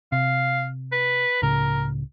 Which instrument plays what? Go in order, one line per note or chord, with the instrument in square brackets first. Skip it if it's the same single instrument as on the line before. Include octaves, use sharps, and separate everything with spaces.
[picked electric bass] C3 [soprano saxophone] F5
[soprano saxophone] B4
[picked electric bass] C#2 A2 C#3 [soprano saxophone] A#4